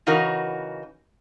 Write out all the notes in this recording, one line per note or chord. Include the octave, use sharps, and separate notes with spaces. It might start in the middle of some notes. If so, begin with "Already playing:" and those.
C#3 E3 D#4 F#4 A#4